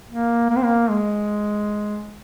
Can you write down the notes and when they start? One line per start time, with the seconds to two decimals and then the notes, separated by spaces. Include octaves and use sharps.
0.09 A#3
0.49 A#3
0.56 C4
0.64 A#3
0.90 G#3